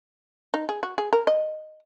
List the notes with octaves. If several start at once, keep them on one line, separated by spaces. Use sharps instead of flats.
D#4
G#4
F#4
G#4
A#4
D#5